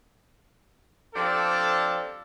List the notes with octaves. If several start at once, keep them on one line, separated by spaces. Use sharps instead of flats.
F3 C4 D4 G4 A4